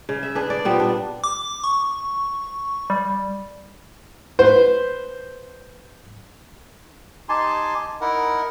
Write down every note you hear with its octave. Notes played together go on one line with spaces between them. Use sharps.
C#3
E5
D4 G#4 B4
D5
A#2 G3 B3 C4
D4
D6
C#6
G3
B4 C5
D#4 G4 G#5 A5 C6
D#4 E4 A#4 F#5